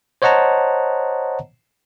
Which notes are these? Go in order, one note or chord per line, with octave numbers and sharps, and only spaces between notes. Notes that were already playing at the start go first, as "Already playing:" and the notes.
C5 C#5 D#5 F#5 A5 A#5